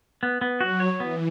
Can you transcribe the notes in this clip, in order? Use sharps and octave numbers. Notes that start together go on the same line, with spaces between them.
B3
B3
F#3 F#4
C#5
E3 B3